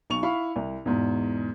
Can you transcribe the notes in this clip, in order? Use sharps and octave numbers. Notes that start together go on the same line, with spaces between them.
B1 C#6 F7
E4 F5 B5 C#6
C2
E2 G#2 B2